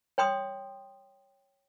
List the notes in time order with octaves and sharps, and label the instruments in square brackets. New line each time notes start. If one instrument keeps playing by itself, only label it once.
[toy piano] C#5 G5 C6 D#6